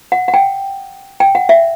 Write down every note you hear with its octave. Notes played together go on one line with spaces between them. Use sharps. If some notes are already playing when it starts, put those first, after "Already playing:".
F#5
F#5
G5
G5
F#5
E5